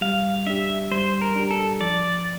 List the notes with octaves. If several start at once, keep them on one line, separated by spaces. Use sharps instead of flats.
G3 F5
D4 G4 E5
G3 C5
A#4
D4 G4
A4
F3 D5